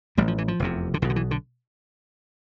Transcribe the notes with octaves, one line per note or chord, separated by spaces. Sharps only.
A1 A2 G3
F3
E3
F3
F1 E2 C3
D3
B1 B2 E3
D3
E3
D3